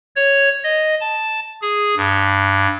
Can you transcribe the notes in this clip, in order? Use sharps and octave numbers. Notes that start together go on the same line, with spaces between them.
C#5
D#5
A5
G#4
G2